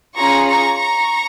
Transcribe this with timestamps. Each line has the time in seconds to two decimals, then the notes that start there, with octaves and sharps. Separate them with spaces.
0.17 C#4 F4 G#4 A#5 C#6
0.49 A#5 C#6
0.80 A#5 C#6